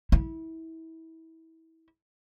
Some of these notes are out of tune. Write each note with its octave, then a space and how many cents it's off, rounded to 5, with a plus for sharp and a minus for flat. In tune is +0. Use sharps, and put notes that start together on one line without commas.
E4 -25